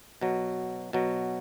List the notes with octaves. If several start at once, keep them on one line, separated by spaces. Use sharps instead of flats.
B2 F#3
B2 F#3